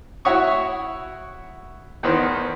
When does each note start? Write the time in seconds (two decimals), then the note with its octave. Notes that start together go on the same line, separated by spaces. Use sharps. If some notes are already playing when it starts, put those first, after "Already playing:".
0.25 E4 F#4 C#5 E5 C#6 D#6
2.03 E2 D#3 B3 C5